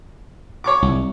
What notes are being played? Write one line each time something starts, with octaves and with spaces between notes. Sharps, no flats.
C#5 C#6 D6
C2